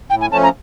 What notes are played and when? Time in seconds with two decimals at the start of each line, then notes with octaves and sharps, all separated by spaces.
0.10 A2 G5
0.21 G#5
0.31 F3 A3 C#4 A5
0.43 A#5